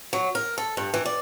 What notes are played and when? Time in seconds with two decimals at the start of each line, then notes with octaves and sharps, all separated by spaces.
0.13 F#3
0.35 A#4
0.58 A4
0.77 G2
0.94 E3
1.05 D5